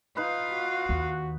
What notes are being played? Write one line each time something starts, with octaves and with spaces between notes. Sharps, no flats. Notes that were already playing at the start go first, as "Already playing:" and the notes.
D#4 F4 B4 F5
F#4
D#2